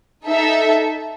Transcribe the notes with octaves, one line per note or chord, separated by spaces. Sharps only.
D#4 A4 E5